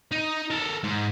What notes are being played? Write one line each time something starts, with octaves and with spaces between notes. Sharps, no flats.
D#4
A4 A#4
G#2